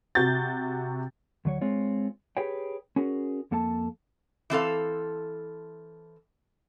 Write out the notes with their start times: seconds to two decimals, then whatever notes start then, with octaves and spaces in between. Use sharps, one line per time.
0.15 C3 F#4 G6 A6
1.45 D2 F#3 C#5
1.61 G#3 C4 F4 C#5
2.37 G4 G#4 B4 C#5 G5
2.96 C#4 F#4 G#4 A#4
3.51 F2 A#3 A4 A5
4.50 E3 C4 A4 F5